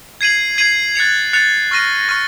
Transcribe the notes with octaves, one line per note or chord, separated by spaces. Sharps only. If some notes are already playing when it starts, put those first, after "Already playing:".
G#6 C7 D#7 F#7
G#6 C7 D#7 F#7
F#6 A6 C#7 F7
F#6 A6 C#7 F7
C#6 F6 A#6 D#7
C#6 F6 A#6 D#7